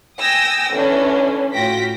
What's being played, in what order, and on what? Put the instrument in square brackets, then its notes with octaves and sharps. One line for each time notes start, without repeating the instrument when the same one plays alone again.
[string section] G5 G#5 D#6 E6 A#6
D3 E3 C#4 D4
A2 F4 F#4 G5 A#6 B6